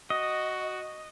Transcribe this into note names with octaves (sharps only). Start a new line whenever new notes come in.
F#4 D#5